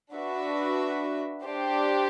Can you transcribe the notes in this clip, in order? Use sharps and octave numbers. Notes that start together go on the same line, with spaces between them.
D4 F#4 B4 E5
D4 G4 C5